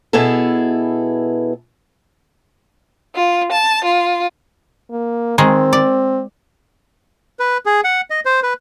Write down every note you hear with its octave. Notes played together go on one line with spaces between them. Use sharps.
B2 B3 E4 G#4 A4
F4
A5
F4
A#3
D#3 G#3 C4
D5
B4
G#4
F#5
D#5
C5
B4